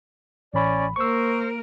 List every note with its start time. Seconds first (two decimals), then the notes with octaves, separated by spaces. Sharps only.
0.54 A1 C#4 D5 B5
0.96 A#3 A#4 C5 C#6 E6